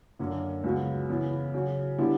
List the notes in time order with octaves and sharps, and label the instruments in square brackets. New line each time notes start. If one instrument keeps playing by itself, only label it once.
[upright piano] F#2 D3 A#3 C#4
C#2 C#3 F#3 B3 F#4
C#3 E3 B3 E4
C#3 F#3 C#4 F#4
D3 G3 B3 E4